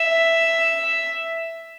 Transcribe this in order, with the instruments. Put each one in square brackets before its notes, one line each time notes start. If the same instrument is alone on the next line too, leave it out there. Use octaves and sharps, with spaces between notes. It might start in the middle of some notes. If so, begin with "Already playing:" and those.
Already playing: [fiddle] E5